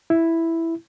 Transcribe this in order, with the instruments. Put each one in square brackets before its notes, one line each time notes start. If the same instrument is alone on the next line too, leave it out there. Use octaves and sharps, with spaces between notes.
[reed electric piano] E4